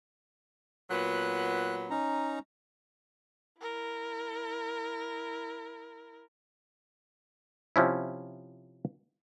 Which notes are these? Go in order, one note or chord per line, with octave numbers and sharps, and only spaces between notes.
A#2 F#3 B3 F#6
C#4 D#4 A#5
E4 A#4
C3 F3 C#4 E4